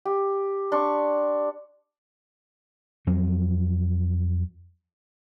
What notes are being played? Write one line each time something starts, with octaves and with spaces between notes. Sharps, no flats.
G4
D4 C6 C#6
F2 F#3 C4